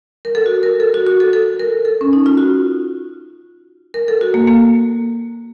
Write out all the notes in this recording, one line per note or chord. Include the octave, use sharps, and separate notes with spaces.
A#4
A4
F#4
A#4
A4
F#4
F#4
A4
A4
A#4
A4
C#4
D#4
F4
F#4
A#4
A4
F#4
A#3
A#3